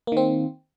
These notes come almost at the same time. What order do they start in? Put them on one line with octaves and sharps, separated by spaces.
A#3 D#3 C4